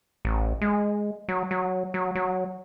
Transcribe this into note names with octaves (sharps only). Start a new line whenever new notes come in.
A1
G#3
F#3
F#3
F#3
F#3